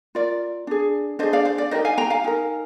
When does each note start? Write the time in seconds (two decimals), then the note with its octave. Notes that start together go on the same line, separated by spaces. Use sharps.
0.15 F4 A#4 D5
0.67 D4 G#4
1.19 D4 G#4 C5 D#5
1.33 D5 F5
1.45 C5
1.58 D5
1.71 D#4 G4 A#4 C5 D#5
1.85 F5 G#5
1.98 G5 A#5
2.10 F5 G#5
2.24 D#4 G4 A#4